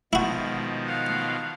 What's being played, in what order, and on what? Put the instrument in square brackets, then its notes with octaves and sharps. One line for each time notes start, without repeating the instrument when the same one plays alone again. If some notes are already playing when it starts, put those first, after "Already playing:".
[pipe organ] B2 D#3 F3 [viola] G#3 [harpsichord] E4 F#4
[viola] F5 F#5